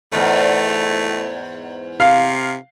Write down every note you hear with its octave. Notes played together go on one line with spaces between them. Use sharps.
E2 G#2 A3
C3 F5